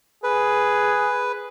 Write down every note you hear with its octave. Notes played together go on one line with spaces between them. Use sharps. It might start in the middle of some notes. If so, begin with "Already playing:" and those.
G#4 B4